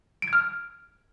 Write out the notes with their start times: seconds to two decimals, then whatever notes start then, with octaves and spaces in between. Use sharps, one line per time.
0.22 D7
0.28 G#6
0.33 F6